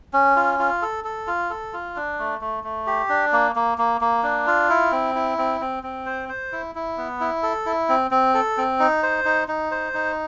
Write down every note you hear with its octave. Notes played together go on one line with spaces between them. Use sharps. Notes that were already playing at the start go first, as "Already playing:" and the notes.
C#4
F4
F4
A4
A4
F4
A4
F4
D4
A3
A3
A3
G4
D4
A#3
A#3
A#3
A#3
D4
F4
E4
C4
E4
C4
C4
C4
C5
C5
E4
E4
B3
E4
A4
E4
C4
C4
A4
C4
D#4
C5
D#4
D#4
C5
D#4